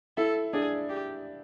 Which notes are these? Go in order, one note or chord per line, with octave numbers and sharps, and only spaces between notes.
E4 A4 E5
D4 G#4 D5
G4